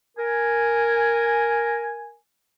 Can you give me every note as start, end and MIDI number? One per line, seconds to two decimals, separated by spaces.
0.17 2.14 70
0.17 2.14 80